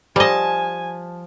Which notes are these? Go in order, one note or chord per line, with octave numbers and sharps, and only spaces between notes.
F3 G3 D#5 G#5 A5